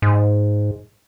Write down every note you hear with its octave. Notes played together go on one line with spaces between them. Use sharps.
G#2